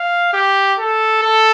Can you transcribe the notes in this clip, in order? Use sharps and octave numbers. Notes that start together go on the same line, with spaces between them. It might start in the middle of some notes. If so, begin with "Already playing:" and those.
Already playing: F5
G4
A4
A4